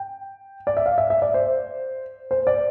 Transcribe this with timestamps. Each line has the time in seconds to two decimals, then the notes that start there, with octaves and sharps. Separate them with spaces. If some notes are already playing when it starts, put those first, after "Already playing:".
Already playing: G5
0.67 D5
0.77 E5
0.86 F5
0.98 E5
1.10 E5
1.22 D5
1.34 C5
2.31 C5
2.47 D5